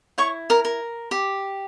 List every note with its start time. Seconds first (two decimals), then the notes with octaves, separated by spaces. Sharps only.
0.18 E4 C#5 C#6
0.50 A#4 A#5
0.65 A#4
1.11 G4